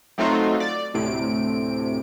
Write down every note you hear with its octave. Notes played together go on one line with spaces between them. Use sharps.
F#3 A3 C4 D#4 F4 F#4
D5
D2 A2 C3 D7